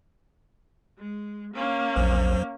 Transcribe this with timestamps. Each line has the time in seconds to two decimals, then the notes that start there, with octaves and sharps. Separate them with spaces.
0.98 G#3
1.54 A#3 C#4
1.96 A#1 E2 F#3 C5